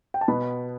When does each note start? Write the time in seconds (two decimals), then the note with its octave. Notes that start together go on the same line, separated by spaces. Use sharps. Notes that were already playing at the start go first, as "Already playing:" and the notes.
0.14 G5
0.21 A5
0.28 B2 B3 B5